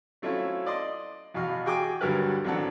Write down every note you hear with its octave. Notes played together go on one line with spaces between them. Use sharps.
F#3 A3 C4 C#4 E4 F4
D5 D#5 C6
E2 B2 F#4 F5
F#4 G#4 G5 G#5 D6
D2 G2 F#3 G3 A#4 B4
A1 F#3 C4 D4 A4 F#5